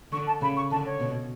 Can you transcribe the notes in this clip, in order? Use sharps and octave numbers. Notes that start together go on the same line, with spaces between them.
D3 C#6
A5
C#3 B5
C#6
D3 A5
C#5
B2